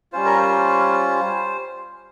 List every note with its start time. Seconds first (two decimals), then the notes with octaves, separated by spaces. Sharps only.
0.12 G3 C#4 F4 C5
0.25 A#4
0.39 C5